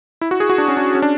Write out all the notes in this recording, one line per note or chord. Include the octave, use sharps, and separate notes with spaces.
E4
F#4
G#4
F#4
D4
C#4
D4
C#4
D4